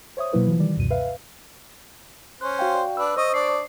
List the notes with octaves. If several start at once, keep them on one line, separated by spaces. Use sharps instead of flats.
C5 C#5 E5 D#6
B2 F#3 A#3 E4 B4
E3 F3
D#3 E3 G3 D5
C#2 F#2 B2 D#7
B4 E5 F5
C#4 C5 F#6
F#4 F5 G5
D5
D4 B4 E6
C5 D#5 C#6 D#6
D4 D5 C7